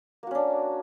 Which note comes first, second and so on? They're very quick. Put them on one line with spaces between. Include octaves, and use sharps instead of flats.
A#3 F#4 C#4 D4